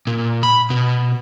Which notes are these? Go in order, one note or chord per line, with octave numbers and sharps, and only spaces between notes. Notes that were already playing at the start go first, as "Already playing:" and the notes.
A#2
B5
B2